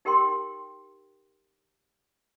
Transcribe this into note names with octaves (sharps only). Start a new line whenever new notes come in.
D#4 G4 A#4 G5 C6